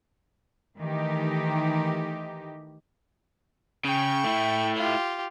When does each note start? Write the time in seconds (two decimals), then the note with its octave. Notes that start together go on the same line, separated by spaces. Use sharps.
0.77 D#3 E3 A3 D#4 G4
3.85 C#3 G5 C#6
4.24 A3 E4
4.75 F4 G4